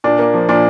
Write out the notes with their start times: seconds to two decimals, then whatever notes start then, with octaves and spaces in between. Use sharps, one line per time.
0.04 A#2 D4
0.19 A#3
0.34 F3
0.49 A#2 D4